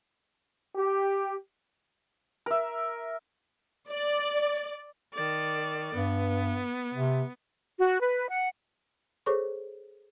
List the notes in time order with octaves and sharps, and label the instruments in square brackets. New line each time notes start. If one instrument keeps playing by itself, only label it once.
[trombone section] G4
[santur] A#4 E5
[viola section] D5
[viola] D#3 D5
[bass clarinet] G2 [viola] B3
[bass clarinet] C3
[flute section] F#4
B4
F#5
[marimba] G#4 A4 C5 C#5 C#6 D6